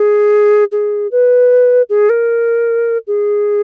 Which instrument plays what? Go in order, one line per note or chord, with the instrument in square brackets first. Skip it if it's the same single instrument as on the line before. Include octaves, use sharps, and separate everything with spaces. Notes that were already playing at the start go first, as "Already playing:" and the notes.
Already playing: [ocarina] G#4
G#4
B4
G#4
A#4
G#4